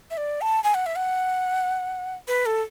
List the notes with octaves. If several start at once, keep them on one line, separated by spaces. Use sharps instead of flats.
E5
D5
A5
G#5
F#5
E5
F#5
B4
A4